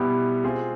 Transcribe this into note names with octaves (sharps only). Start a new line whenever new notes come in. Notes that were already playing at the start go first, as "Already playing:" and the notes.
Already playing: B2 G3 B3 E4 G4
G#3 C4 F4 G#4